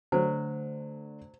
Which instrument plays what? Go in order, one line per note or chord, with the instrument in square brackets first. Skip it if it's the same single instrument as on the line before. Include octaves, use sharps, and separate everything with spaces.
[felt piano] D3 A3 [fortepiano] F#3 [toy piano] C5